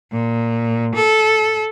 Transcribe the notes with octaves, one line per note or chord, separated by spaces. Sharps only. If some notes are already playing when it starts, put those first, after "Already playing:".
A#2
A4